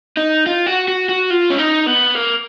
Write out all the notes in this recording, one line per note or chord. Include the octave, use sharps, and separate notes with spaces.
D#4
F4
F#4
F#4
F#4
F4
C#4
D#4
B3
A#3